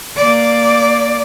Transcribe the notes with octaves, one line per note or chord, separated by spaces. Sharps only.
A#3 D5